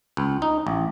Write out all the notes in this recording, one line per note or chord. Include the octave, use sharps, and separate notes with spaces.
C#2
D#4
A1